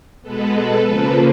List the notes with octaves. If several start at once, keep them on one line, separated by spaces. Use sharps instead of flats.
B2 G#3 B3 A4 B4
A4 B4
C#3 F3 A#3 A4 B4